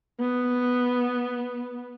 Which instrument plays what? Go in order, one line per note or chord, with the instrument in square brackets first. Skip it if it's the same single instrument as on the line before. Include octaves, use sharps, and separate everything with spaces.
[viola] B3